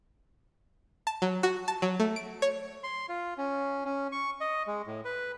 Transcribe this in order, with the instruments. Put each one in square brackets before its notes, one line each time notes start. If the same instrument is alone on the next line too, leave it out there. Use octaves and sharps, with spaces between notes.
[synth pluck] A5
F#3
F#4
A5
F#3
A3
D7
C#5
[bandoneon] C6
F4
C#4
C#4
C#6
D#5
G#3
A2
B4